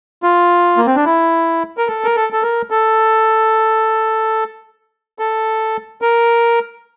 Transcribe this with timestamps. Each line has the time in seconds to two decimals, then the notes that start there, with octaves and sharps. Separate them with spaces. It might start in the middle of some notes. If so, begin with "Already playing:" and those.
0.23 F4
0.77 A#3
0.86 C4
0.96 D4
1.05 E4
1.78 A#4
1.87 A4
2.04 A#4
2.16 A4
2.33 A4
2.42 A#4
2.70 A4
5.19 A4
6.02 A#4